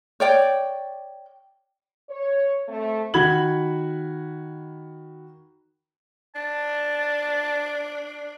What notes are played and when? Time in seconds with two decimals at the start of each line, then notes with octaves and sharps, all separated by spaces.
0.20 C#5 D5 G5
2.10 C#5
2.68 A3 C4
3.14 D#3 F#4 B5 G#6 F#7
6.35 D4 A5